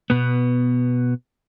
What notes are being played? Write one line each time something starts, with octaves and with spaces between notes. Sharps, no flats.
B2 B3